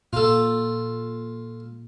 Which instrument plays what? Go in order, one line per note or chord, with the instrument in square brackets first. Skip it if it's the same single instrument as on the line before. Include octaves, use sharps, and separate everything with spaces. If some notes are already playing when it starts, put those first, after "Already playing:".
[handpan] A#2 [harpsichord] F4 A4